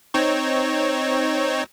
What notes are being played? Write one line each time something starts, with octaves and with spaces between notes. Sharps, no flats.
C4 D#4 C#5